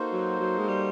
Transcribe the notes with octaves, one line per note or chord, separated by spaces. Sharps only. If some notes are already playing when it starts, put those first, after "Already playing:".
Already playing: A#3 D#4 F#4 A4 C5
F#3
F#3
G#3
G3